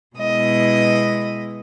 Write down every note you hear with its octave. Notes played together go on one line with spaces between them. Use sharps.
B2 G#3 B3 E4 D#5